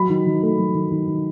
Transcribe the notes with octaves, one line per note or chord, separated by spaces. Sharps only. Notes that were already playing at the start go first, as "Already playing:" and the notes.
Already playing: F#3 B5
D#3
D#3
A3
F#3
D#3
D#3
D#3